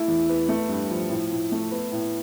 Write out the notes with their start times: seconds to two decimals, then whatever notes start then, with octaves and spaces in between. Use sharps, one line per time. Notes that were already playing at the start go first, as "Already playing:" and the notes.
Already playing: A3 E4
0.08 E2
0.29 B3
0.49 A3
0.69 G2
0.91 F3
1.10 A2
1.31 A2
1.52 A3
1.71 B3
1.92 A2